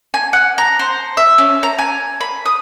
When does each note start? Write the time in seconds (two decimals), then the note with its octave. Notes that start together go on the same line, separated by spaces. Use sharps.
0.14 G#5
0.33 F#5
0.58 A#5
0.79 C5
1.17 E5
1.38 C#4
1.63 A#5
1.78 G#5
2.21 B5
2.45 D#6